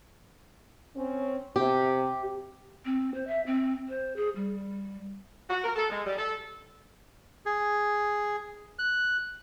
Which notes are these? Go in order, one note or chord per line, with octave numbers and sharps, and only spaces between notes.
C4 C#4
C3 G4
C4
C5
E5
C4
C5
G#4
G3
F#4
A#4
A4
G#3
G3
A4
G#4
F#6